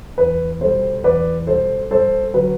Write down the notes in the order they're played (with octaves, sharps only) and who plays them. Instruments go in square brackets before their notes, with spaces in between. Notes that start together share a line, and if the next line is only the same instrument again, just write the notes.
[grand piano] E2 B4
B2 G3 A4 C5
E2 B4 D5
B2 G3 A4 C5
G2 A4 C5
D3 F#3 B4